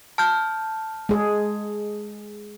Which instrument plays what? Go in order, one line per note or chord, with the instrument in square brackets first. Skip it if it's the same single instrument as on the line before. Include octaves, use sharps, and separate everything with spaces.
[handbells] A5 F6 G6
[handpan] G#3 G#4